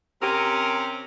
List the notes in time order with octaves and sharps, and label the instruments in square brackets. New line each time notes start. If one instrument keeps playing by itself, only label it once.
[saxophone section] C3 C4 C#4 G4 A#4